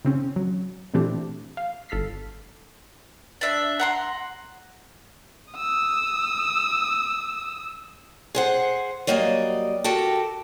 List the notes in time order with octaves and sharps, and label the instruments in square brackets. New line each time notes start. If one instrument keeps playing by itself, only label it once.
[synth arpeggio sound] C#3 C4 C#4
F#3
A#2 E3 A3 C4 D4 G4
F5
G1 A4 F6 B6 C7
[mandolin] D4 E5
F#5 A#5 C6
[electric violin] D#6 E6
[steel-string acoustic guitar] G#4 C5 F#5
F#3 G3 A#3 D5 D#5
F#4 G4 A4 A#4 G5 A5